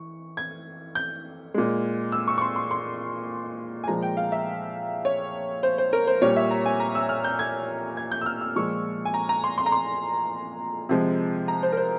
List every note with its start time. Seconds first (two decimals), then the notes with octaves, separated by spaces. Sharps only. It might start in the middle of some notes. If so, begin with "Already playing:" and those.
Already playing: E3 C#6
0.37 G#6
0.95 G6
1.54 A#2 G#3
2.12 E6
2.28 C#6
2.38 C#6
2.42 C6
2.56 C6
2.71 C6
3.84 G#5
3.88 A#2 F3 G#3 A#5
4.02 G5
4.17 F5
4.32 E5
5.05 C#5
5.63 C5
5.78 C5
5.93 A#4
6.07 C5
6.22 A#2 G3 C#5
6.36 E5
6.51 A#5
6.66 G#5
6.80 A#5
6.95 E6
7.09 F6
7.24 G6
7.39 G#6
7.97 G#6
8.12 G6
8.21 E6
8.26 F6
8.41 E6
8.56 A#2 F3 G#3 C#6
9.05 G#5
9.14 A#5
9.29 A#5
9.44 C6
9.58 C6
9.66 A#5
9.72 C6
10.89 C3 F3 G#3
11.48 A#5
11.63 C5
11.72 A#4
11.77 C5